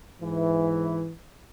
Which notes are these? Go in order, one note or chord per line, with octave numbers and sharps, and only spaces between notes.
G#2 E3